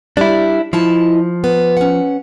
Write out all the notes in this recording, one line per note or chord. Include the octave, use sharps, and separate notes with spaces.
G3 D4 E4 D5
F3 E4 D#5 A5
B3
C#4 F#5